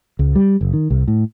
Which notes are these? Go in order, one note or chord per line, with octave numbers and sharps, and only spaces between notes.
C#2
G3
F#1
D#3
C2
A2